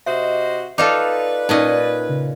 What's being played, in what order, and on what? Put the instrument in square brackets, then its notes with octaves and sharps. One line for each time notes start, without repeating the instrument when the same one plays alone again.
[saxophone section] C3 F#4 C5 [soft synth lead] D#5 [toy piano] E5
[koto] D#4 F4 A4 [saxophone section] B4 [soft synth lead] D5 [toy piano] D6
[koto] A#2 C#4 D#5 [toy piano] D#4
[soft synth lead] C#3